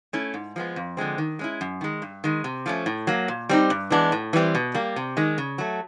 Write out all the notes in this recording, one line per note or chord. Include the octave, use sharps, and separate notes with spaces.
A3 C#4 E4
G#2
F3 G#3 B3
F2
D3 F3 G#3 C4
D#3
G#3 C#4 E4
F#2
D#3 G#3
G2
D#3 G#3
C3
F3 A3 C#4
A2
F#3 A#3
A#2
G3 C4 D#4
G2
E3 G#3 B3 D4
A2
E3 G3 C4
B2
G3 A#3
C3
D#3 G#3
C#3
F#3 A3